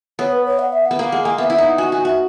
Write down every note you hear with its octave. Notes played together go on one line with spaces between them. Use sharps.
B3 C#5
B4
C#5
F#5
E5
F#5
B3
A#3
G#3 F#5
A#3 G#5
B3 E5
E4 E5
D#4
F#5
F#4 G#5
F#4 G#5
F#4 E5